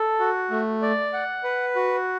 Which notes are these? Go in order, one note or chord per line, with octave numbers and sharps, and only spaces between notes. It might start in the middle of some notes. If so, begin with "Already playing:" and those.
Already playing: A4
F#4
A3
D5
F#5
B4
F#4